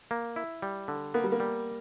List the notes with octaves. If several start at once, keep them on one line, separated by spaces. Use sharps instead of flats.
A#3
E4
G3
D3
A#3 B3
G3
A#3
G3